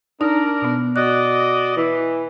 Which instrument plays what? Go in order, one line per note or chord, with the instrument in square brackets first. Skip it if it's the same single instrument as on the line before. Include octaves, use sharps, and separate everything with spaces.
[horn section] D4 A#4 [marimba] D#4
[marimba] B2 B3
[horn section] F#4 D5 D#5 [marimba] F#6
[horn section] E3